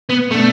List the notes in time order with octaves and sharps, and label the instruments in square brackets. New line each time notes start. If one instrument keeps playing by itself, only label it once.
[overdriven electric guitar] B3
[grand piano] B2 B3 D4 [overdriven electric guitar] A3